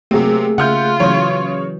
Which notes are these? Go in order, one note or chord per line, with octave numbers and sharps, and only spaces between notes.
C3 F#3 A3 A#3 C4 G4 G#4
C#3 F4 E5 F#5 F6 G6
C#3 E3 F#3 E4 C#5